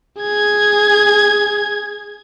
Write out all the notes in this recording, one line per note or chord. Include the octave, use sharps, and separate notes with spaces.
G#4 G#6